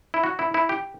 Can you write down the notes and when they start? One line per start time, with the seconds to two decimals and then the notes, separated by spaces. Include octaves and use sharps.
0.14 E4
0.23 F#4
0.39 E4
0.54 E4
0.69 G4